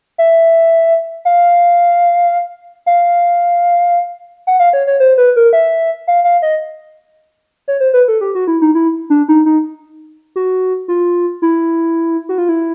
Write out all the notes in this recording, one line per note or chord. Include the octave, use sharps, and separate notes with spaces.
E5
F5
F5
F#5
F5
C#5
C#5
C5
B4
A#4
E5
F5
F5
D#5
C#5
C5
B4
A4
G4
F#4
E4
D#4
E4
D4
D#4
D#4
F#4
F4
E4
F#4
F4
E4